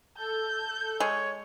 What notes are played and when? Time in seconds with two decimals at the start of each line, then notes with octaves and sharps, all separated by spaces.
0.17 A4 G6
1.00 G#3 C#5